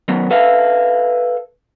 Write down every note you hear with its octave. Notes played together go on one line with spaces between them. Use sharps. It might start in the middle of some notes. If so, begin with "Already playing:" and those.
D#3 F#3 B3
A4 B4 E5 F5